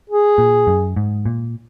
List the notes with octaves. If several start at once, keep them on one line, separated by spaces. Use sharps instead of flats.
G#4
A#2
F#2
G#2
A#2